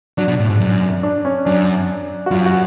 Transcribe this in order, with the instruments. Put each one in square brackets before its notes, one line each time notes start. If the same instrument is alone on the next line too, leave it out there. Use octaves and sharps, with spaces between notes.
[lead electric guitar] F#3 [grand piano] D4
[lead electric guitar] B2
A2
G#2
F#2
[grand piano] D4
C#4
[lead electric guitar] F#2 [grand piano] D4
[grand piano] F#4
[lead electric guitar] F#2 [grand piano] F4
[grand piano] F#4